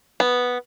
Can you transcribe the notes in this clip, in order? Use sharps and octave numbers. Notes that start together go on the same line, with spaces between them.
B3